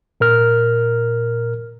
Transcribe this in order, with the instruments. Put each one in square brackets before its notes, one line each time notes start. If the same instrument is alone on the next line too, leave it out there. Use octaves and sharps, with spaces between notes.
[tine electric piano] A#2 A#4 F6